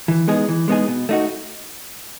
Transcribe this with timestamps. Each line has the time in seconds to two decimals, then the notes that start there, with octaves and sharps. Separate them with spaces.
0.08 E3
0.28 G#3 B3 D#4 G#4
0.49 E3
0.68 G#3 B3 D#4 G#4
0.88 B2
1.09 A3 D#4 F#4